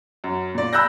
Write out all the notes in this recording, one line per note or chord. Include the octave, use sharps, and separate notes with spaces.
F#2
A#2 D5
B5 E6 F#6 G6 A#6